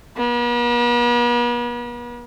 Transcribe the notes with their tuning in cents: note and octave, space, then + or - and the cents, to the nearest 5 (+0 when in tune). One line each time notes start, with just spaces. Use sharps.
B3 -45